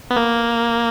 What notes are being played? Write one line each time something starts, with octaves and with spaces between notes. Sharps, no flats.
B3
A#3